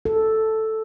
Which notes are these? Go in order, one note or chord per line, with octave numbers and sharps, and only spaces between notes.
A4